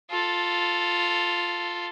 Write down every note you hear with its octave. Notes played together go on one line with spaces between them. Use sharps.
F4 A4